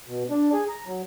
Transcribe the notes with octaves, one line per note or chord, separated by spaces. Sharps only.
B2
D4
G#4
A#5
F#3